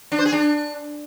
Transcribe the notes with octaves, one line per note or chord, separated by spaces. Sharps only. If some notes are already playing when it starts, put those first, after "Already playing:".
D4
C5
G#4
D4